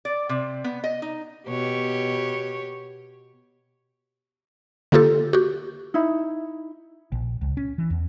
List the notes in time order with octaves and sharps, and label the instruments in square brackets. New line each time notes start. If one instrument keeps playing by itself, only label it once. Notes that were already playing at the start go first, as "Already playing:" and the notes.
[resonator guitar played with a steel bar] D5
C3
B3
D#5
D#4
[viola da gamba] B2 G4 C#5
[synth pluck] D3 A#3 F4 G4 A4
F#4 G4
[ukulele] D#4 E4
[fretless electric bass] A#1
C#2
C#4
E3
E2